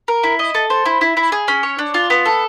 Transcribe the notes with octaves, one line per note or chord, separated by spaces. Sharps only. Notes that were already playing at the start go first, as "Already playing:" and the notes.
A#4
E4
D#5
A4
C5
E4
E4
E4
G#4
C#4
C#5
D4
F4
B3
A4